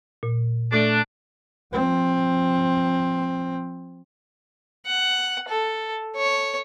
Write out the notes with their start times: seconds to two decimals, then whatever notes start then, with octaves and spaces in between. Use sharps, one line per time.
0.23 A#2
0.72 A3 D4
1.73 F3 C4
4.86 F#5
5.49 A4
6.16 C#5